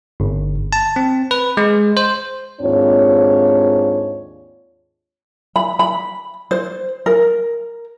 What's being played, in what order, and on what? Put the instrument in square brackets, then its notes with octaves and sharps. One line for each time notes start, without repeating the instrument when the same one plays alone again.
[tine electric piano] G1
A5
C4
B4
G#3
C5
[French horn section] D#2 G#2 C4 D4 F4 C#5
[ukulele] B5
B5
C5
A#4